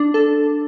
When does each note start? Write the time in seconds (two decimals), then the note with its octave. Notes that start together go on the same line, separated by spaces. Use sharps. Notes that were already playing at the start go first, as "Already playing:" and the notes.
Already playing: D4
0.14 A4